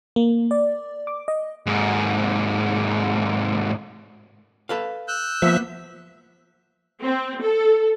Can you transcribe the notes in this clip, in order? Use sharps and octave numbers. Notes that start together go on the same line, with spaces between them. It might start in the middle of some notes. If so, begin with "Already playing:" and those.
A#3
D5
D6
D#5
D#2 G#2
A4 B4 F5
E6 F#6 G6
F3 A#3 B3 E5
C4
A4